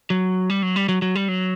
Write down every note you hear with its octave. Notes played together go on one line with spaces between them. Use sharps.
F#3
G3
F#3
G3
F#3
F#3
G3
F#3